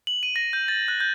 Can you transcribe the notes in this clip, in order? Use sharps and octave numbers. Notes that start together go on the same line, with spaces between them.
F#7
D#7
A#6
G6
A6
F#6
G6